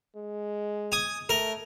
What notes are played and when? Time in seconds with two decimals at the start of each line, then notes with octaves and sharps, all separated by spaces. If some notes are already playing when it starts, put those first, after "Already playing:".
0.16 G#3
0.92 G#5 D#6
1.29 A3 A#4